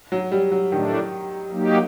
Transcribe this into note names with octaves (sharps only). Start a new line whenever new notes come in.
F#3
G3
F#3
A2 D#3 A3 D4
F#3 A#3 D#4 G4